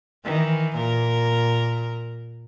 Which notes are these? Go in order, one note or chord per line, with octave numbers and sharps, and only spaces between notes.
D#3 E3
A#2 A#4